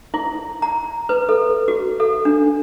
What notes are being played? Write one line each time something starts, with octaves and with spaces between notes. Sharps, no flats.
E4
A#5
B4
A4
F#4
A4
D4